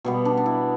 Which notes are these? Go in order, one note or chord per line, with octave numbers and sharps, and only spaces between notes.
B2 G3 B3
D4
D4
E4